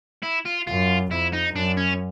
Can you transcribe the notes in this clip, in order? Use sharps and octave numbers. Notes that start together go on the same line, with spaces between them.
E4
F4
F#2 F4
F2 E4
D#4
F#2 D4
C#4